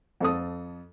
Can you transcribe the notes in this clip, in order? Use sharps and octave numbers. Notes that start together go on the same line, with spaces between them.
F2 A4 D#6